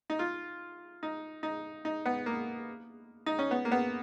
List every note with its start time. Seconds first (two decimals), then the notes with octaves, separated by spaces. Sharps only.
0.10 D#4
0.19 F4
1.03 D#4
1.43 D#4
1.85 D#4
2.06 B3
2.26 A#3
3.26 D#4
3.39 C#4
3.51 B3
3.65 A#3
3.72 B3